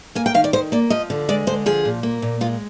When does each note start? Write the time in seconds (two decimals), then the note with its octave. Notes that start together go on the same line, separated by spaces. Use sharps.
0.15 A#3 G#5
0.26 G5
0.34 D#3 F5
0.44 D5
0.53 D#3 C5
0.72 A#3 D5
0.90 F3 D#5
1.10 D3
1.29 G#3 D5
1.47 D3 C5
1.66 F3 G#4
1.85 A#2
2.03 A#3
2.22 A#2
2.41 G#3 F4